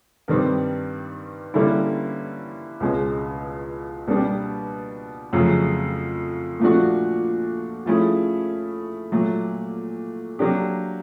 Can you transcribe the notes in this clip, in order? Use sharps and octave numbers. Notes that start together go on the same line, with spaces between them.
G2 D#3 G3 C4
D3 G3 A#3 C#4 E4
C#2 B2 G#3 C#4
B2 G3 A#3 D4 G4
F2 C#3 F#3 A3
A#2 F3 A3 D4 F#4
F3 A3 C#4 E4 G#4
A#2 F#3 A3
F#3 A#3 D4 G4